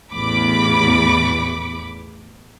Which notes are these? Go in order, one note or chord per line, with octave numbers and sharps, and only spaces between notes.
A1 E2 B5 D6